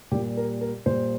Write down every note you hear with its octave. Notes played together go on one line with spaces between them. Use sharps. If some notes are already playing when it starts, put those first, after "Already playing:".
A#2 G3 A#3 G4
A#4
A#4
A#2 G3 A#3 C5